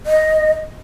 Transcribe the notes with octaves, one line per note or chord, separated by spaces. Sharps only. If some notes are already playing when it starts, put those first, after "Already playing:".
D#5